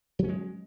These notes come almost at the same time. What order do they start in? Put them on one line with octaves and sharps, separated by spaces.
F#3 C#4 G#3